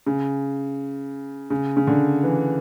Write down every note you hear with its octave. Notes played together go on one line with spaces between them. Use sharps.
C#3
C#3
C#3
D3
E3